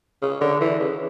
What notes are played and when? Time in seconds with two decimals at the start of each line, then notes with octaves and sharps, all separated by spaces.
0.22 C#3
0.41 D3
0.61 E3
0.80 C#3